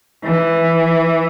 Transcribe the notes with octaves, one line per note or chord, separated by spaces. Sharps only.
E3